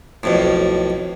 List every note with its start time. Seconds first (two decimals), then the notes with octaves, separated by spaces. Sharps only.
0.23 B1 F2 A2